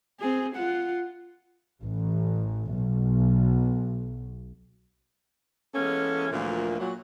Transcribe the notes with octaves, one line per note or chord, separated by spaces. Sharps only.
C4 G#4
F4 F#5
A1
B1
E3 G#3 A#3 B3 C#4 A4
D2 A#2 E3 F3 A#3
A#2 F#3